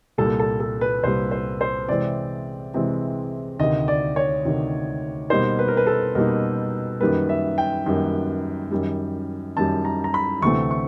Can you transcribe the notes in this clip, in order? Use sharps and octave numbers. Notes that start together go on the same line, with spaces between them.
C2 A#2 G3 A4
A4
A4
B4
C2 A#2 G3 C5
C5
C5
C3 E3 G#3 C4 D5
C3 E3 G#3 C4
D2 C3 D#3 D#5
D5
C#5
D2 C3 D#3
B2 G3 A#3 D#4 C5
B4
A#4
B4
A4
B2 G3 A#3 D#4 A#4
F#2 D#3 G3 A#3 B4
E5
G5
F#2 D#3 G3 A#3
F#2 D#3 G3
F#2 D#3 G3 A5
A#5
A#5
B5
D2 C3 E3 A3 C4 C#6
C#6